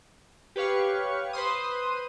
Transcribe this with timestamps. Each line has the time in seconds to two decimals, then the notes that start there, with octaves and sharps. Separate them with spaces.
0.56 G4 B4 C#5 F5 C#6
1.33 B4 C5 C6 D#6